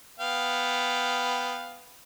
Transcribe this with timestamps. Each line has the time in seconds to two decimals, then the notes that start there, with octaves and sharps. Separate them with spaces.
0.20 B3 F5 G5